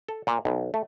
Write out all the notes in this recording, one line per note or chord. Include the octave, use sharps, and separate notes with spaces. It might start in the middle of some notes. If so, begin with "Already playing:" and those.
A4
A#2
B1
A3